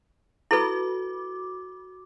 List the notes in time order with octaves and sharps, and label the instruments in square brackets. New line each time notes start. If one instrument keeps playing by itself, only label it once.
[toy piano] E4 A4 B4 [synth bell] F#4 D6